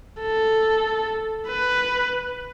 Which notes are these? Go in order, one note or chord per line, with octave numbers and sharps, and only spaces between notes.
A4
B4